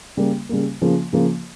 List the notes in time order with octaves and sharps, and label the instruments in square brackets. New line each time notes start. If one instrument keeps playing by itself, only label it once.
[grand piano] C#3 G3 A#3
C#3 G3 A#3
C#3 F3 A#3
C#3 F3 A#3